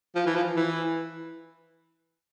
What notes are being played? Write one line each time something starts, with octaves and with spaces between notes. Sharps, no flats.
F3
E3
F3
E3